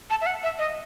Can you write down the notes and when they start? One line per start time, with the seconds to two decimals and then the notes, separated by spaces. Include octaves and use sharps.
0.10 A5
0.21 E5
0.26 F#5
0.43 E5
0.59 D#5